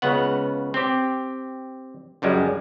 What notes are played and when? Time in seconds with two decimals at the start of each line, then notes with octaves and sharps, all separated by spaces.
0.02 C#2 C#3 B3 F#5
0.74 C4 G4
2.22 C#2 F#2 G3 G#3